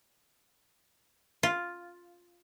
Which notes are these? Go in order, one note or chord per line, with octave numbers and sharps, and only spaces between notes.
F4